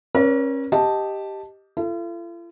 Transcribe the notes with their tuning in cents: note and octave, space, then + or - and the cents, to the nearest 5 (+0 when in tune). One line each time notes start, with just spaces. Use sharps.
C#4 -25 A#4 +40 D5 -45
G4 +0 D#5 +0 A5 +0
F4 -45 A4 +0